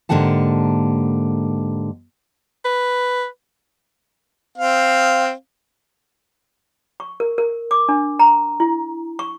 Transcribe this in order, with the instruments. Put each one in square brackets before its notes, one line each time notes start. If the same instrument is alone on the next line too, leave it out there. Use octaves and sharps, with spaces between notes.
[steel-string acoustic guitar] G#2 D3 A#3 G4 F#5 A5
[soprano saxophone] B4
[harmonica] C4 F5
[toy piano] C#6
A#4
A#4
D6
D4
A#5
E4
C#6